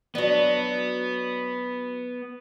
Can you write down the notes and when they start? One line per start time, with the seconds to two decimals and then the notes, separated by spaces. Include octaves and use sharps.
0.15 F#3 B3 D4